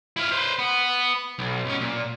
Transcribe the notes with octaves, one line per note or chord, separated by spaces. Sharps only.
E4 F5
B4 C5
B3
B1
B1 C#4
A#2